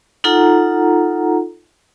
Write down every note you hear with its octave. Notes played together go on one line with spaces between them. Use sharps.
D#4 F4 A4 F#5 A#5